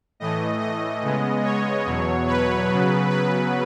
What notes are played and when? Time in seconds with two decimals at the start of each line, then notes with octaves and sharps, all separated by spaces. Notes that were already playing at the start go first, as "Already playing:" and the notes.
0.20 A2 E3 A3 D#5
0.61 D#5
1.03 C#3 G#3 B3
1.44 C#5
1.85 E2 B2 F#3
2.27 B4
2.69 C#3 F#3 B3
3.10 B4